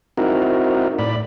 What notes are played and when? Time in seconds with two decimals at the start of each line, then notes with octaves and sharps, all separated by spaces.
0.17 C4 D#4 E4 F#4 A#4
0.99 A2 D5 B5